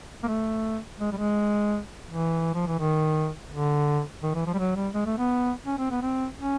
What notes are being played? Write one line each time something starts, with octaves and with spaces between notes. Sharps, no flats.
A#3
A3
G#3
G3
G#3
E3
F3
E3
D#3
D3
D#3
E3
F3
G3
F#3
G3
G#3
A3
B3
C#4
C4
B3
C4
C#4